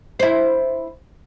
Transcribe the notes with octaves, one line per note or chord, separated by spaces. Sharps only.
E4 C5